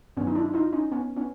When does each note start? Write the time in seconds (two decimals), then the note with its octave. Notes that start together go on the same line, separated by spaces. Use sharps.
0.17 G2 D#3 F#3 B3 C#4
0.27 D#4
0.35 D4 E4
0.46 E4
0.54 D#4 F4
0.73 C#4 D#4
0.92 B3 C#4
1.16 B3 C#4